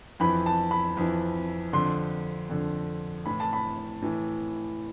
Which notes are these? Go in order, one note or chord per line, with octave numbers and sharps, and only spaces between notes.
F2 E3 B5
A5
B5
F2 E3
F2 D3 C6
F2 D3
A2 E3 B5
A5
B5
A2 E3